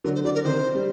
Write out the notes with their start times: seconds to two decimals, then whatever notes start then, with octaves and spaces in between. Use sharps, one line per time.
0.04 D3 F#3 A#4
0.15 C5
0.25 D3 F#3 D5
0.35 A#4
0.45 C3 D#3 C5
0.75 G3